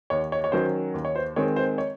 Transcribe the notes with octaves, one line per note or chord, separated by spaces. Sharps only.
D#2 C#5
C#5
C#5
D#3 F#3 C#4 C5
D#2
C#5
C5
D#3 G#3 C4 C#5
C5
C#5